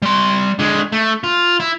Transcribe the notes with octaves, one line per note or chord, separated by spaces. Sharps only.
G3 C6
D3 G#3
A3
F4
E4